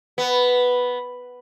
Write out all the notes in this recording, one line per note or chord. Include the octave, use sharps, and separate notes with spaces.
B3